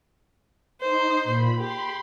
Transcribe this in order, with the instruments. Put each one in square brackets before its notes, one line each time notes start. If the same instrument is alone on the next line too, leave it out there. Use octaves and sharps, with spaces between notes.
[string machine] D#4 [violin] C5
[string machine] A#2 B5
[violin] G4 [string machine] B5 C6